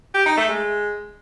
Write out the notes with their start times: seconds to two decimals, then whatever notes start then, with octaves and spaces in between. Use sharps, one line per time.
0.14 G4
0.26 D#4
0.37 A3
0.49 G#3